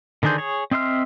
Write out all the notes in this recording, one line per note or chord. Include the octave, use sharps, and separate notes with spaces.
D3 D#3 D4 G#4 C5
G#4 C#5
C4 D#5 E5 C6 F6